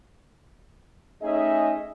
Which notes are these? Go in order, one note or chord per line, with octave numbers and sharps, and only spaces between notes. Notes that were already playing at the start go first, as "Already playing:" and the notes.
A3 C#4 D#4 G#4 D#5 E5